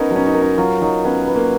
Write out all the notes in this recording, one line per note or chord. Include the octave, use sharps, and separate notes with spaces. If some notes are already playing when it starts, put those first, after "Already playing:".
Already playing: B3 C#4 D#4 A#4
F#3 C#4
D#4
A#4
D#4
F#3 F4
F#3 D#4
B3 C#4
B3
A#3